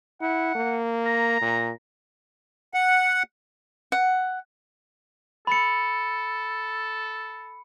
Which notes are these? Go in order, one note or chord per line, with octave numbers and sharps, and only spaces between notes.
E4 F#5
A#3
A#5
A#2
F#5
F#5
A4 B5 C#7